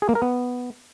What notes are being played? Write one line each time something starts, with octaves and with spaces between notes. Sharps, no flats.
G#4
A#3
A#4
B3